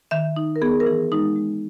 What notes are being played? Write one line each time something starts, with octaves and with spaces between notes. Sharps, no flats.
D#3 E5
D#4
A#4
B3 G#4
A#4
E3 G#4
G#3 D#4
G#3